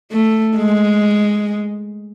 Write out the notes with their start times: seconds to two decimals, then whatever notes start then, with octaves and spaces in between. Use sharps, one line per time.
0.11 A3
0.57 G#3